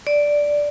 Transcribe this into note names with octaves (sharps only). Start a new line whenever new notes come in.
D5